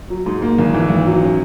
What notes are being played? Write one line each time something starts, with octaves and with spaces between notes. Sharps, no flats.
F#3
G#2
A#3
G#1
E3
G#1
F#3
C#4